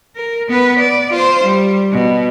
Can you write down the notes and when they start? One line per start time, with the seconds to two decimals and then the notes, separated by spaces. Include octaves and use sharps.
0.16 A#4
0.48 B3 B4
0.79 D5
1.11 F4 C5
1.44 G3
1.92 B2